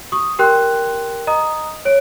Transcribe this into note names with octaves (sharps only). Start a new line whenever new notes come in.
C#6 D#6
G4 A#4 G5 C6 F#6
D#5 A#5 D#6
C#5 D7